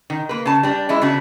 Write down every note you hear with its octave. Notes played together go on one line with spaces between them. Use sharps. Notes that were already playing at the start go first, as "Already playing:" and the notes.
D#3
A#3 B4
C#3 A5
G3 D4
E3 G#3 E4
C#3 B3 D4 F#4